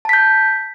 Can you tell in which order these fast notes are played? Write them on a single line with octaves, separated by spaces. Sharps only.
A5 B6 G6